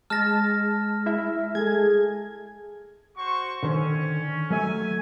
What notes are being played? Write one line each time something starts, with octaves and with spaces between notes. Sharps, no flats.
G#3 A5 F6 A#6
E4 E5
G#3 G#4 A4 G#6
F#4 C5 C#6
D3 D#3 C#4 C5
F#3 A3 E5 G#5